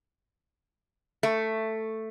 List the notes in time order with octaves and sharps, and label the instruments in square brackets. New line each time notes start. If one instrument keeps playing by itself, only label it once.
[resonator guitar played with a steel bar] A3